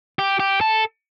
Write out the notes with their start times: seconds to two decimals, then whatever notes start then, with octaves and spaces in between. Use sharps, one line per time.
0.19 G4
0.40 G4
0.61 A4